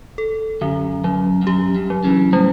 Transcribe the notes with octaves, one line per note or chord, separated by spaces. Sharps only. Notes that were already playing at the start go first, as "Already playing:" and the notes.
A4
F#2 D3
F#2 F#3
G2
F#2 G4
G2
F#3
C#3 E3
A2 C#3 G3